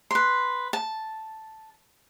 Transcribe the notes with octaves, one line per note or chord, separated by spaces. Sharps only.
B4 C6
A5